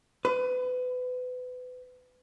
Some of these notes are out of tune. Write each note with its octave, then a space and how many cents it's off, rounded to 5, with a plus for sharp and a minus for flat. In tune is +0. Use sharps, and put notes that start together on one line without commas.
B4 +30